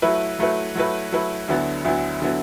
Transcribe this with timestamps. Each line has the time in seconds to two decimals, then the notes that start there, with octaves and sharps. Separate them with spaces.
0.02 F#3 A3 E4 B4
0.39 F#3 A3 E4 B4
0.76 F#3 A3 E4 B4
1.12 F#3 A3 E4 B4
1.48 D2 D3 F#3 B3 E4
1.85 D2 D3 F#3 B3 E4
2.22 D3 F#3 B3 E4